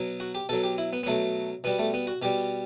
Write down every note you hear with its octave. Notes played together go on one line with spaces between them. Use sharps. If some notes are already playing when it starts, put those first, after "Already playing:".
Already playing: B2 F#3
F#4
G4
B2 F#3 A4
G4
E4
B3
B3
B2 F#3 A3
B2 G3 B3
A3
B3
F#4
B2 G3 G4